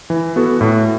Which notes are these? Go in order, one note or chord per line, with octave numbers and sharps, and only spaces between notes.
E3
B3 F#4 A4
A2